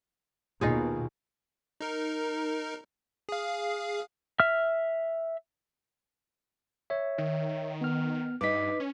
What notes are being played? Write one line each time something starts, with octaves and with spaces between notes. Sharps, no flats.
D#2 B2 D#4 F4 G#4
D#4 A#4
G#4 F5
E5 F6
C#5 E5
D#3
B3 F6
G2 D#4 B4 D6 B6
C#4